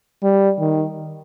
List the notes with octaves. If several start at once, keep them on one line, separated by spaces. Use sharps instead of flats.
G3
D#3